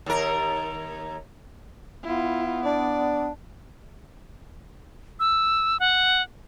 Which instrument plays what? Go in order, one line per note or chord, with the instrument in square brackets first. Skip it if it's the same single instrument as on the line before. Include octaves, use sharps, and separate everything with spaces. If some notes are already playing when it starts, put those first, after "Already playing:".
[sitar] D#2 A#4
[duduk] B3 [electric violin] E4 F4
[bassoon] D4 [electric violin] D5
[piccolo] E6
F#5